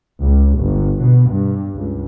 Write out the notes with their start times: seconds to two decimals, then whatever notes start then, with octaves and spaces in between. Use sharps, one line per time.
0.19 C#2
0.58 G1
1.00 B2
1.29 G2
1.75 C#2